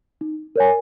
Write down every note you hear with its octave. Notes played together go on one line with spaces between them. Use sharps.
D#4
A#4 C#5 G#5